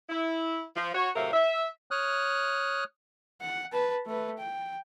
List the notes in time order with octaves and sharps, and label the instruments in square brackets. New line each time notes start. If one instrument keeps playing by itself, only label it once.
[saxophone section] E4
F3
F#4 C#5
A2 C3 F#3 A3 A#4 F5
E5
[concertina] C#5 D#6 F6 F#6
[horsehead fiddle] F#5
B4 A5
A3 B4
G5